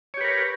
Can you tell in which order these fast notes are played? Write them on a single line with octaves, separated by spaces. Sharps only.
C#5 G4 B4 A#4